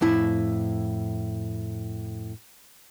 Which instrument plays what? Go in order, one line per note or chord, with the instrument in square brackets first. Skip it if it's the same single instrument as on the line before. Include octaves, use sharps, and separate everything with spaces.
[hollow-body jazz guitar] F2 A2 E4